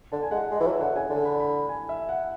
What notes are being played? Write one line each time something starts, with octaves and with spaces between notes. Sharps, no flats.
D3 A5
G#5
G#3 F#5
G#3 D5
E3
F#3 E5
D3 F#5
C#3 G#5
D3 A5
B5
B5
G#5
E5
F#5